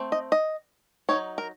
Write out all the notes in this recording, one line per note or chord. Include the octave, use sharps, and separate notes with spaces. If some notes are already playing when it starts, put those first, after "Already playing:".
Already playing: A3 C4
D#5
D#5
F#3 C4 D#4 C#5
A#4